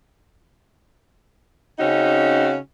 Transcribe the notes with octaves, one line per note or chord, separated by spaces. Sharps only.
C#3 C4 C#4 D#4 F#4